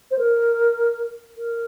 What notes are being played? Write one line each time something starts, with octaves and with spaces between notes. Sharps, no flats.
C5
A#4
A#4